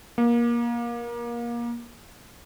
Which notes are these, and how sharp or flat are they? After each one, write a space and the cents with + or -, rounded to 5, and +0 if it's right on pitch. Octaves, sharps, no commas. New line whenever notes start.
A#3 +25